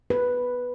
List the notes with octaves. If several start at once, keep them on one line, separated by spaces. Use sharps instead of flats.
B4